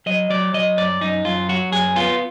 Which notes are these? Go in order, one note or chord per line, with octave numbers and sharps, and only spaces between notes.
F#3 D#5
F#3 D5
F#3 D#5
F#2 D5
F#2 D#4
F#2 F4
F#3 F#4
F#2 G#4
B3 F4